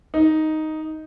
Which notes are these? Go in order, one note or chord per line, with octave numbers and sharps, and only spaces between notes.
D#4